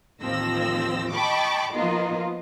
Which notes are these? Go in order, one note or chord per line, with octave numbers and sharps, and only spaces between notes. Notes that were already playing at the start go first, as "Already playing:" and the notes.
A1 D#2 F3 C4 E6 A#6
D#5 G5 A5 B5 C#6 D6
F3 A#3 B3 D#4 F4 D#5